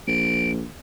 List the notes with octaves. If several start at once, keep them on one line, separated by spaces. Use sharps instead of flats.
A#1 D7